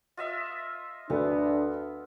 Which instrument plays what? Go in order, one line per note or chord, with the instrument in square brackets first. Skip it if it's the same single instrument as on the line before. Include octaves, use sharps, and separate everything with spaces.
[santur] F4 D#5 E5
[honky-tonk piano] D2 [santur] B3 [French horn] D4